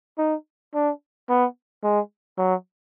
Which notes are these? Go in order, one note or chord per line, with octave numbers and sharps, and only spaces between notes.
D#4
D4
B3
G#3
F#3